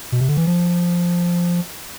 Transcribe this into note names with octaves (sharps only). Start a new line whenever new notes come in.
B2
C3
D3
E3
F3